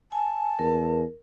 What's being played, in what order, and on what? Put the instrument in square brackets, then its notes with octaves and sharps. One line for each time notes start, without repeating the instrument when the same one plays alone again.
[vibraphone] G#5 [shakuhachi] A5
[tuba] E2 [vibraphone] A#4